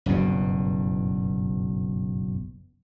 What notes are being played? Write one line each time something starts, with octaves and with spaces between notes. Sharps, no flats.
F#1 B1 G2 B2